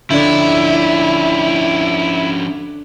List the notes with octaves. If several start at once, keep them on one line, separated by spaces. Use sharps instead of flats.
D3 F3 C#4 D4 E4